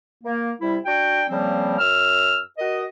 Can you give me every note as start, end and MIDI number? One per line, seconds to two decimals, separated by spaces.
0.24 0.51 58
0.61 0.77 48
0.61 0.77 55
0.61 0.77 64
0.86 1.24 62
0.86 1.24 66
0.86 1.24 79
1.29 1.78 49
1.29 1.78 53
1.29 1.78 55
1.29 1.78 58
1.29 1.78 60
1.79 2.39 42
1.79 2.39 88
1.79 2.39 89
2.59 2.84 66
2.59 2.84 70
2.59 2.84 75